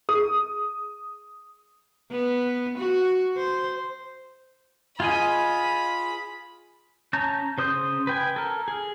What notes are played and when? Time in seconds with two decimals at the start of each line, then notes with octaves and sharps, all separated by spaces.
0.09 G#4 D#6
2.11 B3
2.78 F#4
3.37 C5
5.00 F4 G#4 D#5 B5
7.13 C#4 A5 A#5 G6
7.58 C#3 C5 D#6 G6
8.07 B4 G5 G#5
8.36 A4 A#4
8.68 G#4